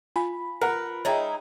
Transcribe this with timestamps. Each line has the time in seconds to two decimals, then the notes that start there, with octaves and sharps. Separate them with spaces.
0.16 F4 G#5 B5
0.61 A#4 B4 F#5
1.05 G#3 D#4 E4 C#5 E5 G5